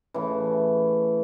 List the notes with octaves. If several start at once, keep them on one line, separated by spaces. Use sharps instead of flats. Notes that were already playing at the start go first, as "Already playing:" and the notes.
A2 C#3 E3